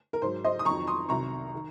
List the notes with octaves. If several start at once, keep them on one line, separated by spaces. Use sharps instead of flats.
A#4
G#2 F#3 C5
C5 D#5
D#6
F2 D#3 F#3 A#5 C#6
C6 D#6
C2 C3 D#3 F#3 A#5 C#6
D#3